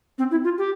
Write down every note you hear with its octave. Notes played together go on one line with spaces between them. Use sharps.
C4
E4
F4
G4